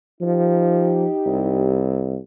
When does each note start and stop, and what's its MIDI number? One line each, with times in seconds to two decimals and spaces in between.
0.21 1.06 53
0.21 1.91 63
0.21 1.91 67
1.26 2.18 36